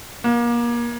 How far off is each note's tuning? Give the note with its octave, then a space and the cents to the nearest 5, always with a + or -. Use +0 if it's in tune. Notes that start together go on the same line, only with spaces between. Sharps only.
A#3 +30